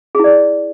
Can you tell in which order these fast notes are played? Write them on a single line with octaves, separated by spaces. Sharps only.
G#4 E4 D5